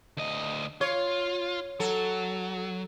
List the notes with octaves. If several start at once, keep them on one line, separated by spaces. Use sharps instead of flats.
D2 D#5
F4 C#5
F#3 A4